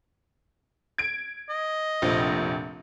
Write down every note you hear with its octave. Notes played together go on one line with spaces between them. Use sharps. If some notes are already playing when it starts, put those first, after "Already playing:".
G#6 D7
D#5
F1 A#1 F3